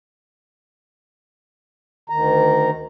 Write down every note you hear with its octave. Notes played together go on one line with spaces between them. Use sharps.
D2 D#3 A#5